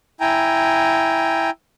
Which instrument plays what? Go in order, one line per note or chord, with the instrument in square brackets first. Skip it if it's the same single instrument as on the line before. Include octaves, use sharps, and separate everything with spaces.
[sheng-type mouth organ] E4 G5 G#5 A#5